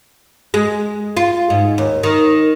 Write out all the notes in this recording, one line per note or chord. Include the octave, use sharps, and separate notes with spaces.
G#3
F4
G#2
D#2
D#3